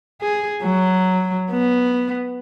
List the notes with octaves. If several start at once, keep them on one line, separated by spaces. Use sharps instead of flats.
G#4
F#3
B3